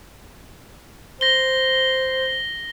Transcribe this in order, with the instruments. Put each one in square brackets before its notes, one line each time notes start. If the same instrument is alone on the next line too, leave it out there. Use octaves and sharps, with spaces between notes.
[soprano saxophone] C5 [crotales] A#6 G7